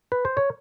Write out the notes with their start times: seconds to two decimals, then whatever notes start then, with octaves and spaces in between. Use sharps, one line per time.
0.12 B4
0.25 C5
0.37 C#5